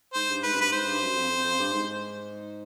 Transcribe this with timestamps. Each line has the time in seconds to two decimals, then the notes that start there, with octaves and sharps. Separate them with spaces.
0.14 G#2 C5
0.30 G2
0.43 G#2 B4
0.54 F#2
0.58 G2 B4
0.72 G#2 C5
0.86 G2
1.01 F#2
1.16 F2
1.30 F2
1.44 F2
1.59 G2
1.73 G#2